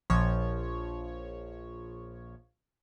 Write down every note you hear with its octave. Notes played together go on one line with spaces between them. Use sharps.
A#1 F3 C#5